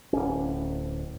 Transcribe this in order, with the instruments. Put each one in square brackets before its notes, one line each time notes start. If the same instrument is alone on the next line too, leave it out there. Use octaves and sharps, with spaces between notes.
[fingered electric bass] D1 G1 C#4